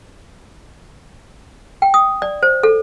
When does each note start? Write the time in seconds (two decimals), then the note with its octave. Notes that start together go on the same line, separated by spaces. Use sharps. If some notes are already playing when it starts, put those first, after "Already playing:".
1.82 G5
1.94 D#6
2.22 D5
2.43 C5
2.63 A4